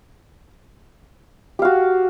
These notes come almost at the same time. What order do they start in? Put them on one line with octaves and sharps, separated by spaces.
G4 F5 F#4